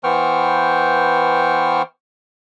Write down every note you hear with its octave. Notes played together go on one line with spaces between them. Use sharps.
E3 B3 C5 G5 C#6 F6